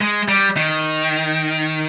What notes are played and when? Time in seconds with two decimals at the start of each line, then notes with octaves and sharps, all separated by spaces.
0.01 G#3
0.28 G3
0.57 D#3